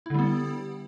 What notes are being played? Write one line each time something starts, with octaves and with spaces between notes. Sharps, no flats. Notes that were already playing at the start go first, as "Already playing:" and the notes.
D3 G3 B3 E4